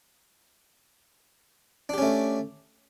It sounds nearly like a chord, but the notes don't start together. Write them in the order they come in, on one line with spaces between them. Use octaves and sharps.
D4 G4 C#4 A3